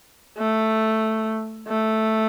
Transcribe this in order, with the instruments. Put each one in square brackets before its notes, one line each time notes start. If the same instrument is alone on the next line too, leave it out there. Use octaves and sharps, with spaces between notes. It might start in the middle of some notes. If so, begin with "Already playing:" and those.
[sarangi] A3
A3